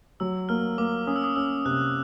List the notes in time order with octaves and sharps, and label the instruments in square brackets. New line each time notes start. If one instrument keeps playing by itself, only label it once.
[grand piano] F#3 [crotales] E6
[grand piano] A#3 [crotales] F6
[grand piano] A#3 [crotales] D6
[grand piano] C#4 [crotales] D#6
[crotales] E6
D#6
[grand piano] C#4 [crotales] E6
[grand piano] C3 [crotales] F#6